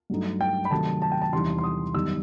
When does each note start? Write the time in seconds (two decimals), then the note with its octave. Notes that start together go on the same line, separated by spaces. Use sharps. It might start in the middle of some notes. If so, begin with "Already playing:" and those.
0.10 G2 F#3 A3 D#4
0.41 G5
0.65 B5
0.71 C3 D#3 F#3 A3 A5
1.02 A5
1.12 G5
1.22 A5
1.33 E2 C3 E3 G3 D#4 C6
1.58 C6
1.64 D#6
1.94 F#2 D#3 G3 B3 D#4 E6